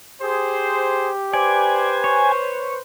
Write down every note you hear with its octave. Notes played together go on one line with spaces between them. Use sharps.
G4 G#4 C5
B4 C5 D5 G#5
C#5